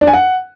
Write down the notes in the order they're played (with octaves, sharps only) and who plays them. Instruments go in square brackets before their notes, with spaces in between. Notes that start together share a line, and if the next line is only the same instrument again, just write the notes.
[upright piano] D4
G#5
F#5